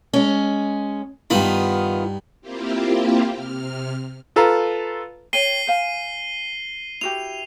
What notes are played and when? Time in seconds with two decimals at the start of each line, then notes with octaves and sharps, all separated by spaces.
0.13 G#3 C#4
1.30 G2 D#3 B3 D#4 F4 B5
2.41 A#3 C4 E4 F4 G4
3.33 C3 F6
4.36 F4 A4 B4 F5 A#5
5.33 C#5 G5 C7 D#7 G7
5.67 C5 F5 G#5
7.01 E4 F#4 G4 F7